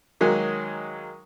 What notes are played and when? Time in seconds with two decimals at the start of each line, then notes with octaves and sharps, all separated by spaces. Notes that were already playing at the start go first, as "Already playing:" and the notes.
0.21 D#3 F#3 G#3 A#3